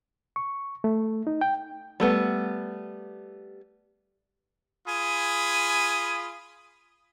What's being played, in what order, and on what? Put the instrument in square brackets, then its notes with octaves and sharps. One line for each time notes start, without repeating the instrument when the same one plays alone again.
[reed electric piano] C#6
A3
D#4
G5
[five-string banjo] G3 A3 B3
[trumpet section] F4 G#4 G#5 B5 D#6